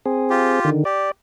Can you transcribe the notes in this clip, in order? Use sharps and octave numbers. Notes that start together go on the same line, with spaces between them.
C4 G#4
F4 G4
D3 D#3
G4 D5